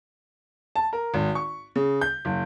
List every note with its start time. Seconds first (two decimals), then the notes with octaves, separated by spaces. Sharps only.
0.76 A5
0.93 A#4
1.14 G#1
1.35 C#6
1.76 C#3
2.01 G6
2.25 F#1